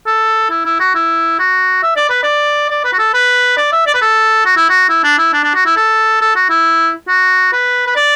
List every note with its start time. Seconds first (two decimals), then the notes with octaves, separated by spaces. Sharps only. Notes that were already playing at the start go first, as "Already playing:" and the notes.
0.06 A4
0.50 E4
0.66 E4
0.80 F#4
0.95 E4
1.39 F#4
1.83 E5
1.96 D5
2.09 B4
2.23 D5
2.70 D5
2.85 B4
2.93 F#4
2.99 A4
3.14 B4
3.57 D5
3.73 E5
3.87 D5
3.94 B4
4.02 A4
4.45 F#4
4.57 E4
4.69 F#4
4.89 E4
5.04 D4
5.18 E4
5.33 D4
5.44 D4
5.54 F#4
5.66 E4
5.77 A4
6.21 A4
6.36 F#4
6.50 E4
7.08 F#4
7.53 B4
7.87 B4
7.96 D5